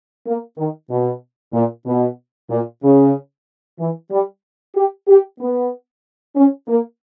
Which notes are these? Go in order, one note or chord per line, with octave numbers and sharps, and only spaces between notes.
A#3
D#3
B2
A#2
B2
A#2
C#3
E3
G3
G4
G4
B3
C#4
A#3